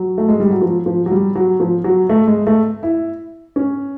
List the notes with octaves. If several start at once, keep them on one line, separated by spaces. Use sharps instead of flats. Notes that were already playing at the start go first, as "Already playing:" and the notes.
Already playing: F#3
A3
G#3
G3
F#3
F3
F3
F#3
G3
F#3
F3
F#3
A3
G#3
A3
E4
C#4